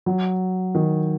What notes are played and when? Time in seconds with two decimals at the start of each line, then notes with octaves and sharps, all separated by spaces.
0.06 F#3
0.75 D#3